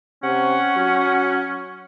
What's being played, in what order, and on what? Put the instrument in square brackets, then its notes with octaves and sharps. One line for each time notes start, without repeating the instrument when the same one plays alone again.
[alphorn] C3 [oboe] C#4 [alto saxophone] F#5
[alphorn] F#3